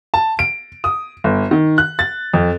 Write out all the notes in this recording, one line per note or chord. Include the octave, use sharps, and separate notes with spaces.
A5
D7
D#6
G1
D#3
F#6
A6
F2